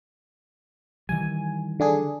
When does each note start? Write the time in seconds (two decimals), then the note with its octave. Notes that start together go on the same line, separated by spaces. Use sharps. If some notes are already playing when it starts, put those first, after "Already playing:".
1.09 D#3 E3 G3 G#5
1.80 D3 D4 G#4